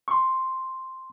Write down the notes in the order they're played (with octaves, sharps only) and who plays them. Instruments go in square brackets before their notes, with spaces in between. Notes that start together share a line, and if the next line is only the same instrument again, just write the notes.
[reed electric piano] C6 C#6